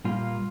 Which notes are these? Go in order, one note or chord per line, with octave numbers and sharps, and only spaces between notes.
A#2 G3 A#3 F4